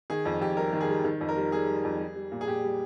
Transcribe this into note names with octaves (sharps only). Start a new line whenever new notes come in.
D#3 G#4
F2
F2 G4
G3 A#4
D#3
G#4
G3
D#3
F2
A#4
G3
G3 G#4
G3
F2
G3
G3
A#2
G#4
A#2 G4
G3